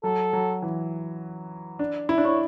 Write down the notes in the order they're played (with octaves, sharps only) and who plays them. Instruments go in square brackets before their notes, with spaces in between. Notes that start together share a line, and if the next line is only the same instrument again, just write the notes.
[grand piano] F#3 [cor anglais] A4
[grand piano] F#3
E3
D4
E4
D4
[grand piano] E4 [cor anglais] C#5